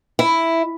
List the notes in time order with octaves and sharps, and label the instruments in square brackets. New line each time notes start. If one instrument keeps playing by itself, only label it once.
[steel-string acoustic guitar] E4